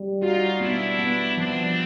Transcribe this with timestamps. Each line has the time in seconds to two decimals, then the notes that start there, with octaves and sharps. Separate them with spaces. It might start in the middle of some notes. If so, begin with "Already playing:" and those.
Already playing: G3
0.22 D#4 F4 F#4
0.60 B3 D4 E4
0.99 B3
1.37 F3 C4 D4